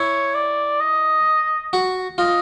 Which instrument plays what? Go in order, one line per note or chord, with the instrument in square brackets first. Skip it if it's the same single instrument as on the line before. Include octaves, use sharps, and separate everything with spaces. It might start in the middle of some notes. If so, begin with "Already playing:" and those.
Already playing: [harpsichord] E4 [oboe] C#5
[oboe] D5
D#5
[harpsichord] F#4
[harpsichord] F4 [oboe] D#5